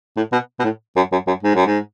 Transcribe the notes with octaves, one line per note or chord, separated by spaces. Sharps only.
A2
B2
B2
A2
F#2
F#2
F#2
G#2
F#2
G#2